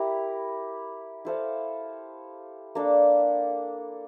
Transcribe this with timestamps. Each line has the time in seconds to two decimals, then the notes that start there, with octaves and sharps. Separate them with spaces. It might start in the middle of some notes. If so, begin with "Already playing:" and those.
Already playing: E4 G4 A#4
1.25 E4 A4 C5 F5
2.75 A#3 D4 A4